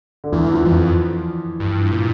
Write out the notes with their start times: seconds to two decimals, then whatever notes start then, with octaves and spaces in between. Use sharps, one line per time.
0.24 D3
0.32 E2 E3
0.54 F3
0.65 F2
1.60 G2
1.92 A#2